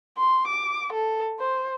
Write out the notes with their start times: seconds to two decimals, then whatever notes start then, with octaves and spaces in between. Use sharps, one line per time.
0.18 C6
0.48 D6
0.93 A4
1.39 C5